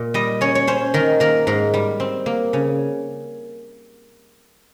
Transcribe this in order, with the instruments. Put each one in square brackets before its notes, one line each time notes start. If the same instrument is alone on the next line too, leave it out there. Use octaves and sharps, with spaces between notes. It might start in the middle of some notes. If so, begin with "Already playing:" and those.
Already playing: [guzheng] A#2
G3 D#5
C#4 C#5
C#5
C#4 C5
D#3 A#4
A#3 A#4
G#2 A#4
G3
C4
A#3
C#3